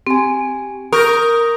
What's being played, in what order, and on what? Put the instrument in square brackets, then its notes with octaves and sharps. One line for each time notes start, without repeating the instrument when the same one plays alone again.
[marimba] C4 [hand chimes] G4 G#5
[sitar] A#4 [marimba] C#6 [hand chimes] D#6 G6 A#6